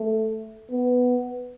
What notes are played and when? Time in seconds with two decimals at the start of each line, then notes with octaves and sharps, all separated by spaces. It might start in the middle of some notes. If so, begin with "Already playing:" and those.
Already playing: A3
0.71 B3